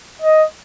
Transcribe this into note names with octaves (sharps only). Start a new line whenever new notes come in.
D#5